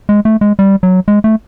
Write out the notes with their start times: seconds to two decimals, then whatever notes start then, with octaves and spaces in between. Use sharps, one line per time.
0.09 G#3
0.25 A3
0.41 G#3
0.59 G3
0.83 F#3
1.08 G#3
1.24 A3